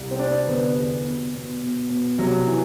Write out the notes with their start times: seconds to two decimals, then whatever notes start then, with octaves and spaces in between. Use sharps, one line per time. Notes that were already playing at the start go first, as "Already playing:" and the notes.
Already playing: C2
0.11 C4
0.19 C3 D4
0.47 D3 B3
0.76 E2
1.04 B2
1.34 B2
1.62 B2
1.90 B2
2.18 C3 F#3
2.47 E3